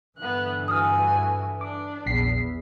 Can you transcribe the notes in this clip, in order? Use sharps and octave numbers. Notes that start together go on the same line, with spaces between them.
G2 D3 E3 B3 F#6
F#4 G#5 D#6 F6
D4 D6
A#1 E2 B6 C7